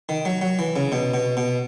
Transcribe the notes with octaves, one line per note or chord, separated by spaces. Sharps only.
D#3
F#3
F#3
E3
C#3
B2
B2
B2